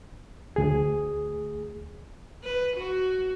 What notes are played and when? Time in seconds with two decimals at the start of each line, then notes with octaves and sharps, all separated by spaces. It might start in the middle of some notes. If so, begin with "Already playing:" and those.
0.56 D2 G#4
2.44 B4
2.77 F#4